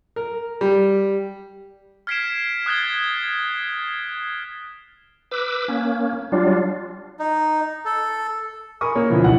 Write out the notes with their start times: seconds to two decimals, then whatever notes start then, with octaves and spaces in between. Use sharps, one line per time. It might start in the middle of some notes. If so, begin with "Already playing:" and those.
0.16 A#4
0.61 G3
2.07 F6 G#6 B6 C7 D7 E7
2.66 D#6 F#6 G#6 A6 G7
5.31 B4 D6 E6
5.68 A#3 C#4
6.32 F#3 G3 D4 F4
7.20 D#4
7.85 A4
8.81 A#4 G#5 B5 C#6 D#6
8.95 A#3 C#5
9.10 D2 B2 E3 F3
9.24 F#1 B1 F#5